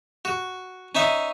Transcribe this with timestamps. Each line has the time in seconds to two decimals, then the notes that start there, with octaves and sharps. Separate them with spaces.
0.25 F#4
0.95 C#4 D#4 E5